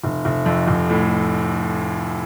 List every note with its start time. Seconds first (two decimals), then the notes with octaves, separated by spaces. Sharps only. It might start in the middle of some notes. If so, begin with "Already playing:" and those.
0.04 F1
0.25 F1
0.46 F2
0.67 F1
0.90 A2